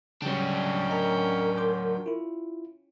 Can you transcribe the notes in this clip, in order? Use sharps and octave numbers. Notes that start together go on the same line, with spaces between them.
C#3 F#3 G3 C#4 D4 G5
A#4 D#5 A5 A#5
C6 D6 G6
E4 F4